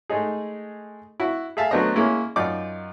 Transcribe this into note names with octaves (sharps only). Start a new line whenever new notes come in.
G#3 A3 D#4 G#4
E4 F#4
G#4 A4 E5 F5 A5
F#3 A3 B3 D4 C5 D#5
G#3 A#3 C#4 E4
F#2 D#4 F4 D5 D6